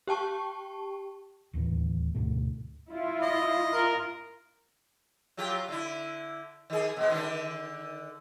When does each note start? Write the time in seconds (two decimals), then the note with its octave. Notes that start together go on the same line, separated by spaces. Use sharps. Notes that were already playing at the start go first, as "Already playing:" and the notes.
0.07 G4 G5 A5 C#6
1.53 D1 D#2 A2 E3
2.15 D2 G#2 B2 A3
2.90 E4 F4
3.22 D#5
3.74 F4 A#4
5.37 F#3 F4 G4
5.68 D3 E4
6.70 D#3 G#4
6.96 B2 G#3
7.10 D3 D#3 D4